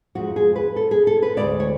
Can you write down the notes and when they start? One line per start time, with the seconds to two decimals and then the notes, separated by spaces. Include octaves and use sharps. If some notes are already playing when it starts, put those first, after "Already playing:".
0.15 F2 F3 G#3 F#4
0.36 G#4
0.56 B4
0.76 A4
0.91 G#4
1.07 A4
1.22 B4
1.37 D2 C#3 G#3 D5
1.60 C#5